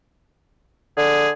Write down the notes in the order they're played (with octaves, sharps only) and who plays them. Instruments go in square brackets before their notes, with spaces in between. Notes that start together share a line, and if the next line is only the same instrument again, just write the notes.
[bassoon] D3 [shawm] G#4